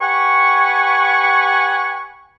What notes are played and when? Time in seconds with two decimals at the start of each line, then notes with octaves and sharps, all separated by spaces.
0.01 G4 B4 F#5 G#5 C#6